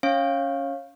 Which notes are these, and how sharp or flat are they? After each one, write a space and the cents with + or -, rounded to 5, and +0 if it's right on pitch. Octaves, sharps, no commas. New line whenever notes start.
C#4 +5 C#5 -20 F5 +0